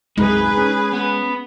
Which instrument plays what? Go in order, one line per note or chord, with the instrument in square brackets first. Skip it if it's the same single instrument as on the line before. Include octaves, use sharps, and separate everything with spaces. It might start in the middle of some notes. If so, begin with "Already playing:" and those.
[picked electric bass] C2 F#2 C3 [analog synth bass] G#3 [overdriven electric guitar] D#4 [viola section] G#4 B4
[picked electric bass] C#4
[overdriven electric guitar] B3 B5